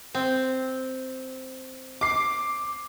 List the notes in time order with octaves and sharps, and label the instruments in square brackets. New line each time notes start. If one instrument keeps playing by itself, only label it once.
[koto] C4
[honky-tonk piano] D6 C7